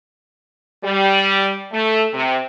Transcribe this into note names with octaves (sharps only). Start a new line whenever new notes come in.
G3
A3
C3